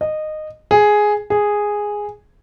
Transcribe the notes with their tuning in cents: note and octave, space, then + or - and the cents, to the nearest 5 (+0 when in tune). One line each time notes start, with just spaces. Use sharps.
D#5 -15
G#4 +5
G#4 -5